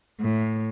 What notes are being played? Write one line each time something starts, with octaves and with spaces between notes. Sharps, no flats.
A2